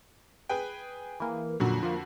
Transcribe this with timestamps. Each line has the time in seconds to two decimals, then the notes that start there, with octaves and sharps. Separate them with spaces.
0.49 G#4 B4 G5
1.20 E3 A#3
1.60 F2 A#2 D3 F#3 F#4
1.83 F3 A#3